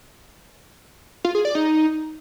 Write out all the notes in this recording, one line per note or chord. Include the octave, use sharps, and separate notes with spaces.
F4
G#4
D5
D#4